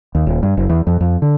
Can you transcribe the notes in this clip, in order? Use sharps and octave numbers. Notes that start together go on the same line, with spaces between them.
D#2
D#1
G2
F#1
E2
F2
F2
D3